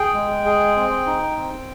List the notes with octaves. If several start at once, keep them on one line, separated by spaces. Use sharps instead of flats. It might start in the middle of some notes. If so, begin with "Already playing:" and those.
Already playing: G#4 G5
G#3
G#4
C4
D#4
C4